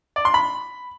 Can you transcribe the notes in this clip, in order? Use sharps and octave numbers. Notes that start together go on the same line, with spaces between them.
D5
C6
B5